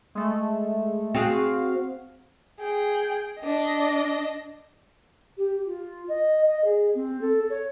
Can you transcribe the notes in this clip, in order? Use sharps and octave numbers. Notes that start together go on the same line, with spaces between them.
G#3 A3
C4 F#4 G#4 F5
G#4 G5
D4 D#5
G4
F4
D#5
D#5
G#4
C4
A4
C#5